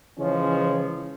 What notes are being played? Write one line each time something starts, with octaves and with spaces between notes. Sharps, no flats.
C#3 E3 F3 G#3 C#4